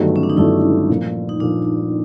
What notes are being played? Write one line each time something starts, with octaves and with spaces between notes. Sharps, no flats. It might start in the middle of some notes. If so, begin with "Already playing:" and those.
Already playing: G1 G2 D#3 F#3 A3
C#4
D4
D#4
G1 G2 D#3 F#3 A3 E4
A#2 F3 A#3
D#4
A#2 F3 A#3 D4